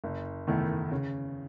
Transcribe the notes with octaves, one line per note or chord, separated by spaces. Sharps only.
F#1
E2 D#3 A3 E4
C#3